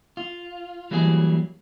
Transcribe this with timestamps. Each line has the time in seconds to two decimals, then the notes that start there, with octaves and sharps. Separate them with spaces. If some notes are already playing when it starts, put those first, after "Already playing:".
0.17 F4
0.91 E3 F#3 G3 A#3 G#4